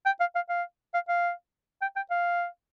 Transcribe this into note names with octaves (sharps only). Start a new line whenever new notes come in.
G5
F5
F5
F5
F5
F5
G5
G5
F5